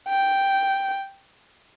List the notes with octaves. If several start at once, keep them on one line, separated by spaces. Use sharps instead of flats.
G5